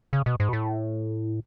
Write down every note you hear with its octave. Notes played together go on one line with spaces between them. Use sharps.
C#3
B2
G#2
B2
A2